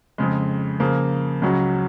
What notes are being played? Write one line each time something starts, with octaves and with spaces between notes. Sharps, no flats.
F2 C#3 G#3
C#3 F3 A#3
C#2 C#3 F#3 C#4 F#4